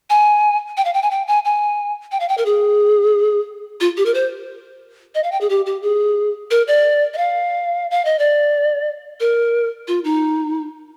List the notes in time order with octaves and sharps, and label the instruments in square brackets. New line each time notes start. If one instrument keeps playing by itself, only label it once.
[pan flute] G#5
G5
F5
G5
G#5
G5
G#5
G#5
G5
F5
G5
A#4
G#4
F4
G4
A#4
C5
D#5
F5
G5
G#4
G4
G4
G#4
A#4
D5
D#5
F5
F5
D#5
D5
A#4
F4
D#4